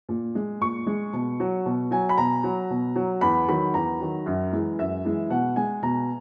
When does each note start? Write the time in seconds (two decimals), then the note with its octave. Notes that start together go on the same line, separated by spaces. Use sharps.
0.09 A#2
0.35 G#3
0.61 A#2 C#6
0.86 G#3
1.13 B2
1.40 F#3
1.66 B2
1.91 F#3 G#5
2.09 B5
2.18 B2 A#5
2.44 F#3
2.70 B2
2.96 F#3
3.21 E2 B5
3.48 D#3 F#3 B5
3.74 E2 A#5
4.00 D#3 F#3
4.26 F#2
4.52 E3 G#3
4.79 F#2 E5
5.05 E3 G#3
5.30 B2 F#5
5.56 G#3 G#5
5.83 B2 A#5